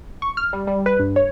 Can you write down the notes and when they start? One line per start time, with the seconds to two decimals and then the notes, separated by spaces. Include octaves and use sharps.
0.22 C#6
0.37 F6
0.53 G3
0.67 G3
0.86 B4
0.99 G2
1.16 C#5